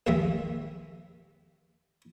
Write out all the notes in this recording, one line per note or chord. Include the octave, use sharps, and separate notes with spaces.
A#1 D#2 D#3 G#3 E5